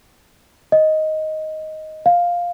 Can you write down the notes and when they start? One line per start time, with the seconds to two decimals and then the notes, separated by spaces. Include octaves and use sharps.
0.72 D#5
2.06 F5